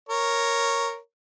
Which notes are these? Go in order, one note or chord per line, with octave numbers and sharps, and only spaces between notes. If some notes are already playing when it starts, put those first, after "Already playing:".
A#4 C#5